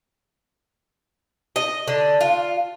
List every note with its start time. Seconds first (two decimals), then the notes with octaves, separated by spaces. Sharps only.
1.56 D#5
1.88 D3
2.21 F4